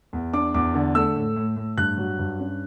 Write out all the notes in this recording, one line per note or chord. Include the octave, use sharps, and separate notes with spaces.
E2
D4 D6
E2 D6
D3
A3 E6
A2
A2
A2
G2 F#6
F#3
G2
C#4